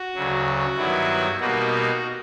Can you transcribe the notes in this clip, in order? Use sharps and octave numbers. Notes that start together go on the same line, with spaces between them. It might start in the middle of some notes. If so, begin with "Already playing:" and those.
Already playing: F#4
D2 C#3 F#3
G2 D#3 F#3 B3 E4
B2 G3 A#3 D#4 F#4